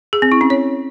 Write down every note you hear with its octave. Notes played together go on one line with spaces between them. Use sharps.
G#4
C4
E4
C#4
C#5